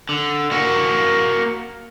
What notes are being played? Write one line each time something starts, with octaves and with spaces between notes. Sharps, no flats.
D3
A#3 F#4